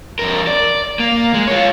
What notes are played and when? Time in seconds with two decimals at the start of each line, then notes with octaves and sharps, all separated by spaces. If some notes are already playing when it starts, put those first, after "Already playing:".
0.19 F2 A#4
0.47 D5
0.99 A#3
1.34 G#3
1.47 F4 C#5